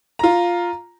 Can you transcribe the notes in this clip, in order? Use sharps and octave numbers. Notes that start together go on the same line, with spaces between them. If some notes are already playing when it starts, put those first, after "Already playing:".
F4 A#5